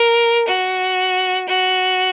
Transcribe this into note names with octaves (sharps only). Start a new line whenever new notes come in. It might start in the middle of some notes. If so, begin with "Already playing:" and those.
Already playing: A#4
F#4
F#4